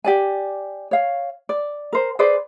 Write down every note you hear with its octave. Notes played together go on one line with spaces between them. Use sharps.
G4 D5 G#5
C#5 F5
D5
A#4 C5
G#4 B4 C5 D5